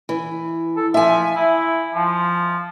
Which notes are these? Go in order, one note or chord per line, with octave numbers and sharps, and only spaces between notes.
E3
A4
F3 E5 G#5
E4
F3